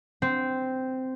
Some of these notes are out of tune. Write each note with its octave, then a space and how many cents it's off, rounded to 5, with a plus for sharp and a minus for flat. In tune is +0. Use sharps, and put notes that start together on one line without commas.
C4 -10